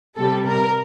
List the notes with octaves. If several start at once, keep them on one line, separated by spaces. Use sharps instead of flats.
C3 G3 A4
A#4